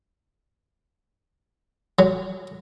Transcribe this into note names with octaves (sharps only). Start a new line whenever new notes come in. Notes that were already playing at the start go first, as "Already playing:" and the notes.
F#3